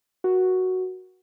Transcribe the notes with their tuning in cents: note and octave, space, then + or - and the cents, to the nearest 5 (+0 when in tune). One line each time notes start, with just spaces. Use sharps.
F#4 +0 A#4 +35